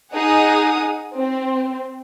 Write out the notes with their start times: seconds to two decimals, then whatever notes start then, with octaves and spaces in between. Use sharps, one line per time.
0.11 D#4 G#4 F#5 D#6
1.14 C4